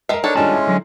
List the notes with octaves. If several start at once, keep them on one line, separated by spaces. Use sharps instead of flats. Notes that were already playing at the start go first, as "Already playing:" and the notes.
G#3 A#4 E5 C7
D4 D#4 A4 C#5
D#3 G3 G#3 C#4 D4 F4 A5
E4 C6
D3 F#3